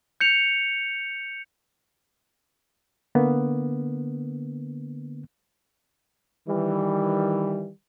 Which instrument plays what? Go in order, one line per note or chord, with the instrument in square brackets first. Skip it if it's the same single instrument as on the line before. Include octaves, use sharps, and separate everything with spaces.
[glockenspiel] G6 C#7 F7
[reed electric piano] D3 A#3 B3
[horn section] D#3 E3 G3